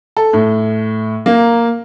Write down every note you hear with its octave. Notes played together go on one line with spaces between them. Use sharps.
A4
A2
A#3